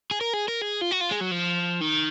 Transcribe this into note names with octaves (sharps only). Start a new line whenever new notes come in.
G#4
A#4
G#4
A#4
G#4
F4
F#4
F4
G#3
F#3
F3
D#3